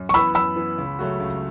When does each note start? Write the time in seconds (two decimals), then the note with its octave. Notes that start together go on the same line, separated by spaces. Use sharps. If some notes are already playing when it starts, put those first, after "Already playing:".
Already playing: F#2
0.09 C#6
0.14 E3 B3 B5 E6
0.35 F#2 B5 E6
0.56 E3 B3
0.78 C#2
0.99 C#3 F#3 A3 F#4
1.20 C#2